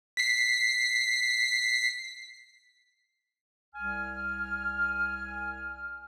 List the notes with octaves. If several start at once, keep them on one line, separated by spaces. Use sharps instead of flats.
B6 C7
C2 G#5 F6